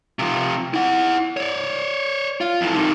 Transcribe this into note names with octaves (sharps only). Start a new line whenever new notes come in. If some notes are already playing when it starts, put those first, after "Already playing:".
C3 F3
E4 F#5
C#5 D5
F4
F2 E3
C3 D#3